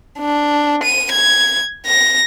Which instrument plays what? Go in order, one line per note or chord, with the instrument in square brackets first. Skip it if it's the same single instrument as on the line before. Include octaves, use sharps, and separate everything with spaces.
[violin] D4
D#7
G#6
A#6